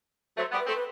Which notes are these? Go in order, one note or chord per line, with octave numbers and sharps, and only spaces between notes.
F#3 A3 C5
G3 B3
B4
A3 C4
B4